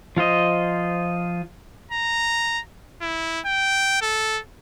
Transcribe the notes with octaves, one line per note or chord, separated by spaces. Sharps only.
F3 F4 C5 D#5
A#5
E4
G5
A4